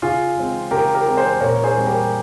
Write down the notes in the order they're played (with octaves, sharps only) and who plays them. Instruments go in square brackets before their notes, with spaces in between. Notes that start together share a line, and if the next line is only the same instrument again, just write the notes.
[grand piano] C#3 F4 G#4
G#3 C4
C#3 G4 A#4
G4 A#4
G#3 C4
G#4 C5
A#2 A#4 C#5
G#4 C5
G3 C4
G4 A#4